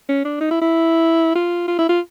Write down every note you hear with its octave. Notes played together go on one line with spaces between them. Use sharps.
C#4
D4
D#4
E4
E4
F4
F4
E4
F4